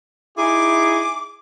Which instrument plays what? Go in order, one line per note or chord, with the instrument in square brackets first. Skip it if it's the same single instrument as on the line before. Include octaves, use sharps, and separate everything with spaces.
[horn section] D#4 E4 G#4 [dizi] D6